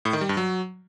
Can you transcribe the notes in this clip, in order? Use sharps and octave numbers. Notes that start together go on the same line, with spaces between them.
A2
D#3
G3
G2
F#3